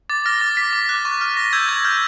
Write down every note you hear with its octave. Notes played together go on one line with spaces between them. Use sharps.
D6 A6
F6 A#6
D6 A6
F6 B6
D6
F#6
C#6
F6
C#6 A#6
E6 G6 G#6
C#6 G#6
F6 G6